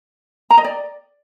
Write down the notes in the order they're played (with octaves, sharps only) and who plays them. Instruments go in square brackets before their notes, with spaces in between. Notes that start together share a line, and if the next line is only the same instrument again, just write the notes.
[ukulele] A#5
D#5
D5